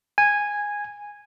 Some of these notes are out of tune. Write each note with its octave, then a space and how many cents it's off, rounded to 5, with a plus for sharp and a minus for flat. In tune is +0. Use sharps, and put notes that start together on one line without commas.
G#5 -10